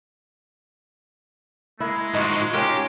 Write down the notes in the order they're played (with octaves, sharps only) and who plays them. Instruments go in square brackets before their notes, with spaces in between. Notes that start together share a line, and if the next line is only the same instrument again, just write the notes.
[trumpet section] G#3 [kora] A#3 E4
[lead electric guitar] G#2 F#4 [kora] D#4 F4
[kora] C#4 F4 A#4 [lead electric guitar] G4